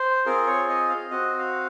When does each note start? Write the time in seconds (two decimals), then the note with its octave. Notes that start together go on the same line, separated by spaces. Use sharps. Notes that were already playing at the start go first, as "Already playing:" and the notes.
Already playing: C5
0.26 C4 F4 G#4 A#4
0.46 C#5
0.69 D#5
0.89 F5
1.11 C4 F#4 D#5
1.38 F5